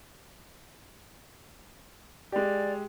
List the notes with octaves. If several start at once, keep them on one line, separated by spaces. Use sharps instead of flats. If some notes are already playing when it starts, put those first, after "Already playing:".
G#3 G4 D5